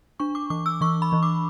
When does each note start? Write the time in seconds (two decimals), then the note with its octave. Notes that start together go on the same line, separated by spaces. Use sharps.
0.20 D4 C#6
0.35 D6
0.50 E3 D6
0.66 E6
0.81 E3 C#6
1.02 B5
1.12 E3
1.23 D6